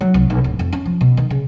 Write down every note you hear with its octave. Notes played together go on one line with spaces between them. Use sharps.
F#3
C2
B1
D1
F2
C#4
F3
B2
D#3
C#3